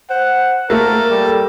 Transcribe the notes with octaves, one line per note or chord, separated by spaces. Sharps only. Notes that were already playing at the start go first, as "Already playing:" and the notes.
C5 F#5
A3 A#3 A4 A#4
G3